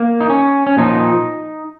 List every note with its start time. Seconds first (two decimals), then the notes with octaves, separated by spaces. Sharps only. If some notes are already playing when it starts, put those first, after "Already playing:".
Already playing: A#3
0.21 D#4
0.30 C#4
0.67 C#4
0.77 A#2 F3 D#4